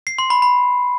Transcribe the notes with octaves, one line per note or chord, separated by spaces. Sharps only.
C7
C6
B5
B5